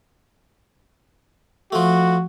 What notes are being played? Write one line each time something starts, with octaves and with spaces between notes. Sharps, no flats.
F3 A3 F#4